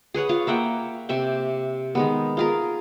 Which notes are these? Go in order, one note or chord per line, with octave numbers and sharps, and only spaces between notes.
G#4 B4 C#5 F#5
F4 C#5
A#3 E5 F#5 G5
C3 E5 G5
D#3 G#3 B3
F4 G#4 A#4